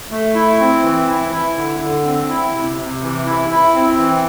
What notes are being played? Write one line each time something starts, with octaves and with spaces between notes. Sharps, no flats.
A3
E4
C4
E3
E4
E4
D3
D3
C4
E4
C3
C3
E3
E4
E4
C4
E3